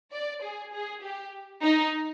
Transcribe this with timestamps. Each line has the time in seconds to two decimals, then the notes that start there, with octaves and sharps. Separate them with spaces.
0.12 D5
0.43 G#4
0.73 G#4
1.03 G4
1.63 D#4